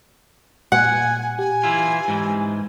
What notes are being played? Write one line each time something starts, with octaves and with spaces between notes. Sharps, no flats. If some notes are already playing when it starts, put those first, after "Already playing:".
A#2 F#5 G#5 F#6
G4 G#5
E3 E4 F4
G#2 E3